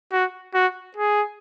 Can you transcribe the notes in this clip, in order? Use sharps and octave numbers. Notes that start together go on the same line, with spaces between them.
F#4
F#4
G#4